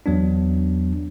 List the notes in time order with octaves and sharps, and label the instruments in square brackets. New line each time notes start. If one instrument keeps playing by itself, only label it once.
[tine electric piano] E2 F#3 B3 D4